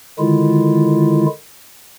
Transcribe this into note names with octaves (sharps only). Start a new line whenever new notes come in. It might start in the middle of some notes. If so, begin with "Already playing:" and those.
D3 D#3 G#3 E4 F4